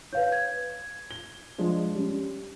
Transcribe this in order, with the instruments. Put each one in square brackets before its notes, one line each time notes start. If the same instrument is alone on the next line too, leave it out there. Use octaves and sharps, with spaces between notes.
[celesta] B4 F5 G6 [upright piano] C#5
[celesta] G#6
[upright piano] G7
F3 G#3 D4
G3 C#4